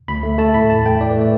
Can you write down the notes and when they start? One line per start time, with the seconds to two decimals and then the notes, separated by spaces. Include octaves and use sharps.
0.08 D2 B5
0.23 A3
0.38 A3 A5
0.54 A2 B5
0.70 E2 A5
0.86 A3 G5
1.00 A2 D5
1.11 B4
1.16 A3
1.21 D5